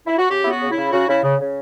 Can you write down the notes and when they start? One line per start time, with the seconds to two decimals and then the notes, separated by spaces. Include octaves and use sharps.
0.07 E4
0.18 F#4
0.29 C#3 G4
0.43 B3 E4
0.50 F#4
0.61 C#3
0.71 E4
0.77 C#3
0.92 C#3 F#4
1.08 C#3 E4
1.24 C#3
1.40 C#3